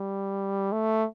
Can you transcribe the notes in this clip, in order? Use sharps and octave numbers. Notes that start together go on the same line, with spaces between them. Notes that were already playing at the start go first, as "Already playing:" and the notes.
Already playing: G3
A3